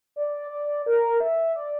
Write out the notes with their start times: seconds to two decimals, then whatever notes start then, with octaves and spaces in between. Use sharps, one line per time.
0.16 D5
0.51 D5
0.86 A#4
1.20 E5
1.56 D5